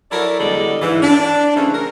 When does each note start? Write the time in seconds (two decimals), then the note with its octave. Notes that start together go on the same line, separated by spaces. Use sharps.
0.11 F#3 E4 A4 A#4 D5
0.40 E2 D3 G3 G#3 A4 D5
0.81 G#2 E3
1.02 D4
1.56 C#3 E3 A3 C4 C#4
1.74 A#4